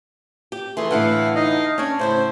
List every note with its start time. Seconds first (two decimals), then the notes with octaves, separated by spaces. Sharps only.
0.52 G4
0.77 E3 A3 G#4 C6
0.91 A2 D3 E3 E4 F5 F#5
1.35 D#4 D#5 F5
1.78 C#4 D4 C#5
1.99 A2 C#3 E4 C5